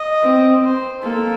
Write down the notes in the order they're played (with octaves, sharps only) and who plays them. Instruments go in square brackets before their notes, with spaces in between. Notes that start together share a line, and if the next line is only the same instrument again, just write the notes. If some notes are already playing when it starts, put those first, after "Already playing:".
Already playing: [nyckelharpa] D#5
[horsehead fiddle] C4
[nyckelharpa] C5
[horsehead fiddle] A#3 [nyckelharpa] A4